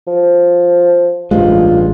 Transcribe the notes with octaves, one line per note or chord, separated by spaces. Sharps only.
F3
A1 G2 G#3 F4